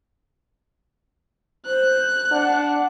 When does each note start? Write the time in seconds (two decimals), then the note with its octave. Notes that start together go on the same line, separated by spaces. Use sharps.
1.66 C5 F#6
2.31 D4 F#5